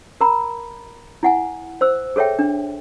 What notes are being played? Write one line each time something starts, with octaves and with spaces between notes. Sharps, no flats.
A#4 A#5 B5
E4 F#5 G#5
C5 E6
G#4 A4 C#5 E5 G5
D4